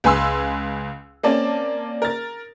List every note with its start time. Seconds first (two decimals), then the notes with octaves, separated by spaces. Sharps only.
0.04 C#2 B4 G#5 C6 E6
1.23 A#3 C4 C#4 D5 A5
2.02 A#4 A6